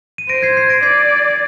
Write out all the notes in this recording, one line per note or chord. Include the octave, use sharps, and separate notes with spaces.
D#7
C5 A#6 D7
G#6 C7
G#6 C7
A#6 D7
D5 G#6 C7